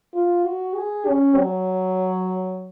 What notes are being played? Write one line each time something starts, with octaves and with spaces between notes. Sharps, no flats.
F4
F#4
G#4
C#4
F#3